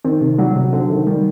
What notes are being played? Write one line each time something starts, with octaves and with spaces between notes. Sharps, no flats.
D#3 C4
C3
F#3 G3
C3
D3 C4
C3 D#3
D#3 G3